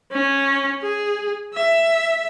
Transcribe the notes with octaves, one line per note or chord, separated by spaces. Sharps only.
C#4
G#4
E5